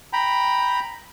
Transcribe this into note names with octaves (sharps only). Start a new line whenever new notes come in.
G5 A#5 B5